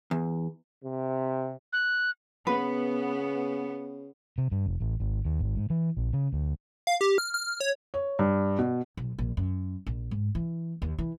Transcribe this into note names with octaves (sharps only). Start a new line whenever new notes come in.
E2
C3
F#6
C#3 B3 B4
C3
G2
F1
A1
G#1
D#2
G#1
G#2
E3
A#1
C#3
D2
F5
G4
F6
F6
C#5
C#5
G2
B2
B1
A#1
F#2
A#1
G#2
E3
D#2
E3